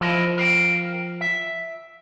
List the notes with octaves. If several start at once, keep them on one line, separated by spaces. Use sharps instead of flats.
F3 E4 A#4 D#5
A#4 F5 G5
E5